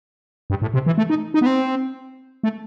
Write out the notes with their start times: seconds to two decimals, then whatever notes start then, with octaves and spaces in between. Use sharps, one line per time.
0.50 G2
0.62 A2
0.74 C3
0.86 E3
0.98 A3
1.10 D#4
1.34 D#4
1.41 B3
1.46 C4
2.43 A3